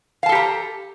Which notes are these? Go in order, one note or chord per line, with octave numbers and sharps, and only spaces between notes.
G4 A4 F5 A5 A#5